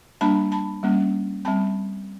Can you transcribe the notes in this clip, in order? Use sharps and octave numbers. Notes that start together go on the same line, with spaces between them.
G3 A#3 D4 A5 B5
A5 B5
G3 A#3 C#4
G3 C4 A5 B5